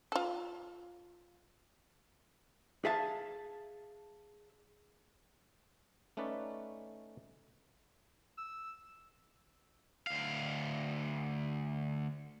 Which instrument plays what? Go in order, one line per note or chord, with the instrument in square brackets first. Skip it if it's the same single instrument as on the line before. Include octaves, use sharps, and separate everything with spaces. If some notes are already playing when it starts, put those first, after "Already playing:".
[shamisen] F4 A4
[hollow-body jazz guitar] G#4 E5 F5 A5
[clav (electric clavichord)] A3 C#4 D#4 B4 D5
[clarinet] E6
[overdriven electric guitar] D2 F5